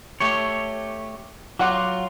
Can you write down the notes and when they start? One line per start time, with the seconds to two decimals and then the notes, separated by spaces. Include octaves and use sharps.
0.20 A3 G4 C#5
1.59 F#3 F4 F#4 F#5 D6